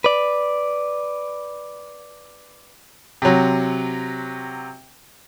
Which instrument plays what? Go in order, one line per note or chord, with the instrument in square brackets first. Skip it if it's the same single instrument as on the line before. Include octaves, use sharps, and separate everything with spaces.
[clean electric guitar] B4 D5
[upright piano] C3 F#3